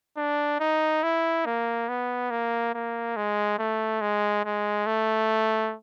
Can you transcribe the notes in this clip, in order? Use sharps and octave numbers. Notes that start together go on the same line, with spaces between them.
D4
D#4
E4
A#3
B3
A#3
A#3
G#3
A3
G#3
G#3
A3